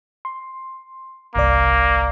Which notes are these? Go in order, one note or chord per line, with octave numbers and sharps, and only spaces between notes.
C6
G1 C2 A#3 D5